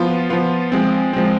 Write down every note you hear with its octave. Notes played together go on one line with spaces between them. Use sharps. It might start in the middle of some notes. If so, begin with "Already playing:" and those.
Already playing: F3 B3 F4
F3 B3 F4
F3 G#3 C4
F3 G#3 C4